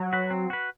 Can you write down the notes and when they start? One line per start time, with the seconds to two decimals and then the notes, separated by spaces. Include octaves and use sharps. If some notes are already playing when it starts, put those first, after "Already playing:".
Already playing: F#3
0.13 F#4 B4
0.30 C4
0.50 F#4 B4